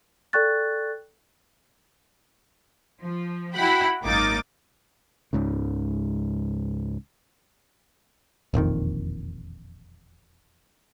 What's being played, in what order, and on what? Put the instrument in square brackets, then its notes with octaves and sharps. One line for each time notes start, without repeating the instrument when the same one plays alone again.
[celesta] A4 D5 G5 C#6 F#6 A6
[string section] F3
E4 F#4 F#5 G5 B5
G#1 F#2 A#3 D#4 D6 A6
[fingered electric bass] C#2 G#2 C#3
[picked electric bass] E1 A#1 F2 D#3